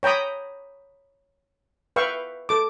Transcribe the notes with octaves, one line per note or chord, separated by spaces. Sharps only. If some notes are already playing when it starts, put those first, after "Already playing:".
C#5 G5 A#5 B5 D#6
B4 E5 F5 G5 C#6
A4 D6